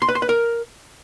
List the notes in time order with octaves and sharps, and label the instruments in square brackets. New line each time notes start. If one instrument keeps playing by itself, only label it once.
[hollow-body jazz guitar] C6
B4
C6
B4
A#4